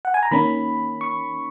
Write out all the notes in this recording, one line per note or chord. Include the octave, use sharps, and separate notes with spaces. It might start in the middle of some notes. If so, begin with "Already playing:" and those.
F#5
G#5
A#5
D#3 A#3 C#4 B5
C#6